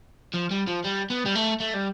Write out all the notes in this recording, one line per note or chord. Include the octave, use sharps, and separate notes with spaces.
F3
G3
F3
G3
B3
G3
A3
A3
G3